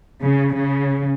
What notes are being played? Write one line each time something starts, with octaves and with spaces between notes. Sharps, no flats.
C#3
C#3